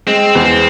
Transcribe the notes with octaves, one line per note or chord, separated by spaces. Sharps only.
G#3 C4
E2